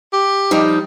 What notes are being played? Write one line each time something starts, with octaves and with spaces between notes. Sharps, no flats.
G4
F3 G3 D#4